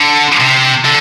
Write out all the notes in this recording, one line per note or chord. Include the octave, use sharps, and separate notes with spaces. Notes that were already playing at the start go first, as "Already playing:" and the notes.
Already playing: D3
C3
D3